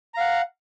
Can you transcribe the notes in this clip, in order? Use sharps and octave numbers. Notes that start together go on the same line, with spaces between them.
F5 F#5 A#5